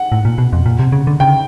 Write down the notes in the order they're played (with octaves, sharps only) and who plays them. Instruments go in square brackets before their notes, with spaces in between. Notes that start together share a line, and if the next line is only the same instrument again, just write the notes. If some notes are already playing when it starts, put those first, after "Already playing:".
Already playing: [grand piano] F#5
[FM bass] A2
A#2
B2
F2
A#2
C3
C#3
D3
[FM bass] C#3 [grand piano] G5